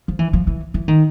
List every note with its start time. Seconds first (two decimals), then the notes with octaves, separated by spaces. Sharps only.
0.08 F3
0.19 E3
0.33 F3
0.47 E3
0.74 E3
0.88 D#3